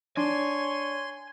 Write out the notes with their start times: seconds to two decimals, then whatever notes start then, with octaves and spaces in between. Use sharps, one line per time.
0.17 D4 C#5 G#5 C6